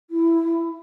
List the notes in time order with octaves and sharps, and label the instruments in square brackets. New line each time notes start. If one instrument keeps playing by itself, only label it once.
[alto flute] E4